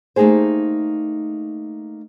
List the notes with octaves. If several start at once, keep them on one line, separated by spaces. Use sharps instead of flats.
A3 A#3 D#4 G4 G#4 C5